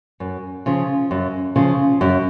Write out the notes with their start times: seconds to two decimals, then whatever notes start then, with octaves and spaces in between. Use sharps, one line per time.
0.20 F#2
0.66 C#3 F3
1.11 F#2
1.56 C#3 F3
2.01 F#2